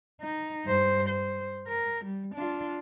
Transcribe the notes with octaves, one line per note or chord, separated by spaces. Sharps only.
D#4
G2 C5
C5
A#4
G3
D4 F4